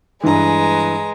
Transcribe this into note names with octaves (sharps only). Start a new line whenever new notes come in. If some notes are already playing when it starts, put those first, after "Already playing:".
G2 E3 G#3 B4 A#5